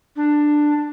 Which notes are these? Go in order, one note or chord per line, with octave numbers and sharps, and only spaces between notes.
D4